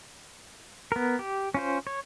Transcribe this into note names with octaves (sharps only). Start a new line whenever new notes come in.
B3 A#4
G4
C#4 F4 C5
C#5